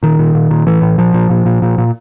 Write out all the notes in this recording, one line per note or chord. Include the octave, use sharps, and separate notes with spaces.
A#2 D#3
A#2
A#2
A#2
A2 E3
A2
A#2 F3
A#2
A#2
A#2
A#2
A#2